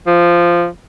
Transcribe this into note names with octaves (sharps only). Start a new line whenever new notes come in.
F3